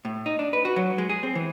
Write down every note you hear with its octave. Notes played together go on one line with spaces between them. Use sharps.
A2
D#4
D4
B4
F#4
F#3
G#3
G#4
C4
E3